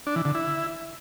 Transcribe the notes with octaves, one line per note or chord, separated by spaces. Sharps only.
D4
E3
D3
E4